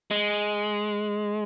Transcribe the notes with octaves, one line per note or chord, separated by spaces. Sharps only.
G#3